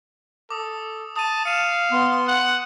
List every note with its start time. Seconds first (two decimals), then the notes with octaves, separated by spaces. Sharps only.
0.50 A4 D6 D#6
1.16 A5 D#6 D#7
1.45 F5 C#7 D#7 E7
1.92 B3 C6
2.27 F#5